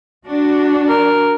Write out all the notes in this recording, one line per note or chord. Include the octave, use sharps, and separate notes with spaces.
D4 F#4
A#4